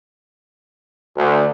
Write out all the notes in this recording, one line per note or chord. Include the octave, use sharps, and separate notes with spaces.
D2